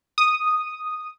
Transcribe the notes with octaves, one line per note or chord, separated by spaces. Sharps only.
D#6